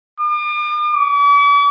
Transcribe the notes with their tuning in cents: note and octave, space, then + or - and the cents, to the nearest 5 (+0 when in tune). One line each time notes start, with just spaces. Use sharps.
D6 +45
D6 -45